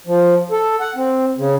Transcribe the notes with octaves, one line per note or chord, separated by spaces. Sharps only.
F3
A4
F#5
C4
C#3